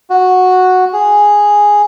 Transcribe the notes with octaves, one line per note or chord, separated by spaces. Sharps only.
F#4
G#4